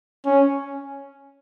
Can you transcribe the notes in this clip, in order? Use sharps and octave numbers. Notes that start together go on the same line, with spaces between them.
C#4